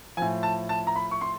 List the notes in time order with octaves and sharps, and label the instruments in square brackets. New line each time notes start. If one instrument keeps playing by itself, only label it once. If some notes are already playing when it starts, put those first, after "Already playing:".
[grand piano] A2 F3 G#5
A5
A5
A#5
B5
C#6
C6